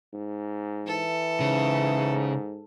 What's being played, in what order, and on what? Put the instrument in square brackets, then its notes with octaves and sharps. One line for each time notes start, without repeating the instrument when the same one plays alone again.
[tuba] G#2
[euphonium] E3 [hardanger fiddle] A4
[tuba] G#2 [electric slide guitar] C#3